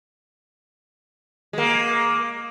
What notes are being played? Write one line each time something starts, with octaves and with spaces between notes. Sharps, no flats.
G#3 A#3